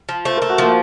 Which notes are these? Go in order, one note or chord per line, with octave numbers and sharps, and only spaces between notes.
F3
A3 C5
A#4
A3
F#4
F3 A#3